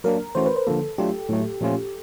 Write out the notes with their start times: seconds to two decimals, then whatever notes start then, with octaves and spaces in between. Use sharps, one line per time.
0.04 F#3 A#3 D4 A#4
0.35 E3 A3 C#4 F#4 C5
0.46 B4
0.56 C5
0.67 D3 F3 A#3 A4
0.98 F#3 A3 D4 F4 G4
1.29 A2 F#3 A3
1.61 A#2 F3 A3 C#4 F4